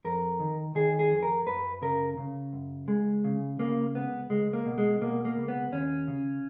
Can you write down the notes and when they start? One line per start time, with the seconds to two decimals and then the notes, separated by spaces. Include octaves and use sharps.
0.05 F2 A#4
0.40 D#3
0.75 D#3 G#4
0.99 G#4
1.11 F2
1.23 A#4
1.46 F#2 B4
1.82 C#3 A#4
2.17 C#3
2.53 F#2
2.88 C#2 G#3
3.24 C#3
3.59 C#3 A#3
3.95 C#2 B3
4.30 C#2 G#3
4.53 A#3
4.65 B2
4.78 G#3
5.01 B2 A#3
5.25 A#3
5.37 C#2
5.48 B3
5.72 D#2 C#4
6.08 C#3